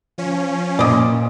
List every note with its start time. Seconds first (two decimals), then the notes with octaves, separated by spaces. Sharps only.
0.18 F3 C#4
0.79 A#2 D5 D#5